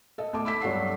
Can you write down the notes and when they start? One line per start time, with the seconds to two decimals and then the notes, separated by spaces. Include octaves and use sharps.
0.18 A4 D#5
0.33 D2 A5 D6
0.45 B5 D6 E6 B6
0.62 G2 F#3 A4 C#5 F#5 C7